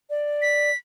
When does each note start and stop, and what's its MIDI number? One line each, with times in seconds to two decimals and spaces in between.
0.10 0.70 74
0.42 0.76 95